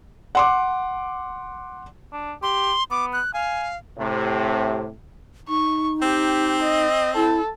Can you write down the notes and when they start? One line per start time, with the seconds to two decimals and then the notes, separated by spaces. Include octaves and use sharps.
0.35 F#5 C6 D6
2.13 D4
2.43 G4 C6
2.91 B3 D6
3.13 F#6
3.34 F5 G#5
3.99 A2 C3
5.48 D#4 C#6
6.02 C4 G4
6.62 D#5
7.16 E4 A4